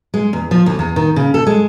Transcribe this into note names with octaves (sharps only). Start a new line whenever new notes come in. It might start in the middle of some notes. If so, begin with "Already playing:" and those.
G#3
E2
F3
D2
E2
D#3
C#3
A4
G#3